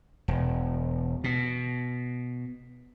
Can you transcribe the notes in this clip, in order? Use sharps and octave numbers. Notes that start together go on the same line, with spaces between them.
E1
B2